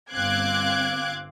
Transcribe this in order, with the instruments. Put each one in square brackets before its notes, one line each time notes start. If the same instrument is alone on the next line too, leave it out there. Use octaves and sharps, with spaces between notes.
[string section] G1 C4 F5 D6 F#6 G#6